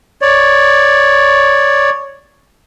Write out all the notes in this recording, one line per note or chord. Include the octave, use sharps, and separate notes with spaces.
C#5 D5